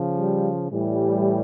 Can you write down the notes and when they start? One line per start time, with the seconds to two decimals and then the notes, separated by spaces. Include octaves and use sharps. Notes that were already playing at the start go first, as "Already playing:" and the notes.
Already playing: C#3 F3
0.12 G3
0.72 A2 E3 G3